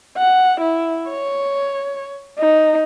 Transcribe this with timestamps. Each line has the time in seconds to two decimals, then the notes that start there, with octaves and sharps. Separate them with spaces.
0.17 F#5
0.60 E4
1.09 C#5
2.39 D#4